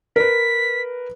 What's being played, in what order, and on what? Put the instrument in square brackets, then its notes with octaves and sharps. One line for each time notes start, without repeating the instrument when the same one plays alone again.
[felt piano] A#4 B4 [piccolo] B6